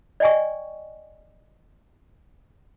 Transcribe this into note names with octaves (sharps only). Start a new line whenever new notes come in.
D5 D#5 G5 G#5 C#6